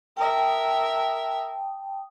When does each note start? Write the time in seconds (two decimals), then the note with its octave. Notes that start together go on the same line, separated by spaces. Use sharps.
0.17 A#4 E5 G5 A5 D#6